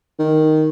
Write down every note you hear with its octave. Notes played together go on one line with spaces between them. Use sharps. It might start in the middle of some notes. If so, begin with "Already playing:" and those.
D#3